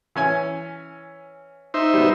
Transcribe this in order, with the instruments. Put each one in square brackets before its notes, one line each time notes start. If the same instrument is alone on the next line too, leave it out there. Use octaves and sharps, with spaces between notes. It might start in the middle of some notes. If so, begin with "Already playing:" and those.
[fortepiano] E3 C#4 G#5
[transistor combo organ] D#4 C5 E5
[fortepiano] G3 B3